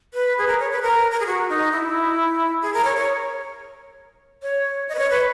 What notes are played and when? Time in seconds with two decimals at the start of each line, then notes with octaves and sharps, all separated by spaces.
0.14 B4
0.38 G#4
0.47 A#4
0.59 C#5
0.71 B4
0.82 A#4
1.11 A#4
1.20 G#4
1.26 F#4
1.49 D#4
1.72 E4
2.62 G#4
2.74 A#4
2.84 C#5
2.97 C#5
4.42 C#5
4.89 D#5
4.95 B4
4.99 C#5
5.10 B4